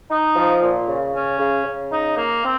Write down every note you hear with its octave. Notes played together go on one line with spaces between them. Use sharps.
D#4
F3
A#2
C#3
C#4
C#3
C#3
D#4
A#3
C4